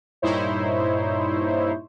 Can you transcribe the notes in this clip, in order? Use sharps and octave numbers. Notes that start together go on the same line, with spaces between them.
G2 A#2 D#4 E4 C5 C#5